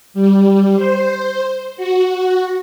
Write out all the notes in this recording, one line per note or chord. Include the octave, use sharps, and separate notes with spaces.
G3
C5
F#4